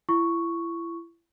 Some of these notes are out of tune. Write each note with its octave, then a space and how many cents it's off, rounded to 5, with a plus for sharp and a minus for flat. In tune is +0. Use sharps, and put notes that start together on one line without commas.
E4 +30 C#6 +0